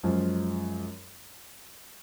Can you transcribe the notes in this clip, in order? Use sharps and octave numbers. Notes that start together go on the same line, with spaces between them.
F#2 F3 G#3 C#4 F4